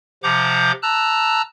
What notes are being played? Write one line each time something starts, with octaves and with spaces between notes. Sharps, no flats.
C3 F3 F#5 A#5 D6 G6
A5 A#5 E6 F#6